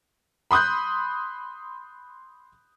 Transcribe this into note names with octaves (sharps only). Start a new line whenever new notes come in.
B5 C6 D#6 F#6 G6